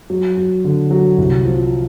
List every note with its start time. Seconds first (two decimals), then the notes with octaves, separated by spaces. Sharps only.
0.10 F#3
0.37 F#3
0.65 D3
0.91 F#3
1.18 C2
1.45 F3